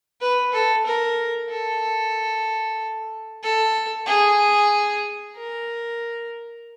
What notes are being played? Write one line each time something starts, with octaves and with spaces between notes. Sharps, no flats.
B4
A4
A#4
A4
A4
G#4
A#4